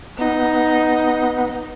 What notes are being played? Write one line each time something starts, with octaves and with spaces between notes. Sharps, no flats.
B3 D#4